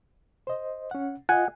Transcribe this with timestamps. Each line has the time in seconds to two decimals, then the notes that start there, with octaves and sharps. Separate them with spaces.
0.47 C5 D#5
0.91 C#4 F#5
1.29 F4 D#5 F#5 G#5